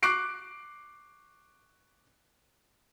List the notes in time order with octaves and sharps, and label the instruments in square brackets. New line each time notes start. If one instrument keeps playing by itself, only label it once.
[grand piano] C#6 D6 F#6 C7 D7